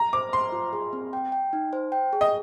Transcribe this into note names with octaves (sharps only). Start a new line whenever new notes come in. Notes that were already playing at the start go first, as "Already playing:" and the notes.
Already playing: A#5
C5 D6
C5 C6
F4
G#4
C4
G5
G5
D#4
C5
G5
G#4
D#5